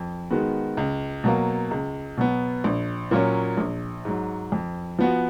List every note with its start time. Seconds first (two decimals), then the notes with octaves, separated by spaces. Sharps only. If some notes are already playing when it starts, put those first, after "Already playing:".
Already playing: F2
0.30 D#3 G#3 B3 F#4
0.77 C#2
1.24 B2 F#3 A#3
1.71 C#2
2.17 B2 F#3 B3
2.64 A#1
3.11 A#2 F#3 A#3 C#4
3.57 A#1
4.05 G#2 F#3
4.52 F2
4.99 F3 B3 F#4